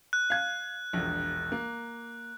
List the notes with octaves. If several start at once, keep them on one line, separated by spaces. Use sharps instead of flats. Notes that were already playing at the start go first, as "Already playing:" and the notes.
F#6
F5 G#6
E1 A#1
A#3